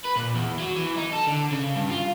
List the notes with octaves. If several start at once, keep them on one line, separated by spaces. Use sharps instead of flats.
B4
A#2
E2
F#3
E3
D#4
A4
D3
C#3
G2
F4